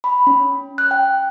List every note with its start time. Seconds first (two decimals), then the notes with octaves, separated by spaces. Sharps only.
0.04 B5
0.27 C#4
0.78 F#6
0.91 G5